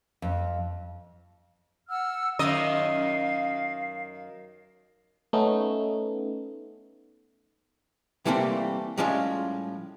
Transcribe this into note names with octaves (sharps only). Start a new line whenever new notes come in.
F2
F#5 E6 F6
F#2 D#3 D#5 F5
A3 B3 C#4 D#4
C3 E3 G3 A3 A#3 C4
A2 F3 G3 G#3 C#4 F4